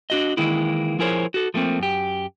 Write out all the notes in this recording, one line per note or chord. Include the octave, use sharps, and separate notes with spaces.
D4 F#4 D#5
D#3 E3 G#3 A#3 E4
F3 E4 G#4 A#4 C5 C#5
F#4 A4
F3 A3 A#3 C4
F#2 G4